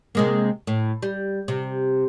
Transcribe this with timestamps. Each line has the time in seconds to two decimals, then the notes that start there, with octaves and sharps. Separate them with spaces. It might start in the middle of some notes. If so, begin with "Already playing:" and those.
0.15 C3 G#3 A#3
0.67 A2
1.03 G3
1.48 C3